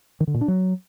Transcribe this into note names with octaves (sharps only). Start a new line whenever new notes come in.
D#3
D3
A#2
D4
F#3